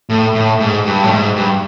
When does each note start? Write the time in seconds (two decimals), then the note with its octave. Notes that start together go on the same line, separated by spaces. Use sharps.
0.09 A2
0.35 A2
0.60 G#2
0.85 G2
1.04 A2
1.11 G#2
1.36 G2